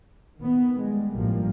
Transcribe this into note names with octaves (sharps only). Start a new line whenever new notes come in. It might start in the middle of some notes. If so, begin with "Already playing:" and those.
D#3 B3
G3 G#3
A1 G2 B2 F3 G3 A#3